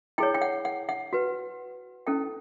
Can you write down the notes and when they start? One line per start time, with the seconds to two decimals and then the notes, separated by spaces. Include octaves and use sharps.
0.18 E4 G#4 C#5 G5
0.34 G5
0.42 F#5
0.65 F#5
0.89 F#5
1.13 F#4 B4
2.07 C#4 E4 A4 G5